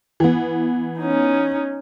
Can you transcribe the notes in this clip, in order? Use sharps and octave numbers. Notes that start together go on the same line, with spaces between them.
E3 B3
C#4 D#4